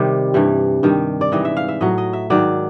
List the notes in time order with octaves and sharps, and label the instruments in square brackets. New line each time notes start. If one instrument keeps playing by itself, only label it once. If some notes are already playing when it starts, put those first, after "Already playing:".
Already playing: [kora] C3 D#3 G3
G2 E3 G3
G2 D#3 G3
D5
G#2 E3 G3 D#5
E5
F5
E5
A2 F#3 D#5
D#5
E5
G#2 D#3 F#3 D5